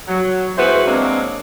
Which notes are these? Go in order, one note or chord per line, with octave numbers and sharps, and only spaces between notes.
F#3
G#3 E4 F#4 B4 C5
F#3 G#3 A#3 C4 D4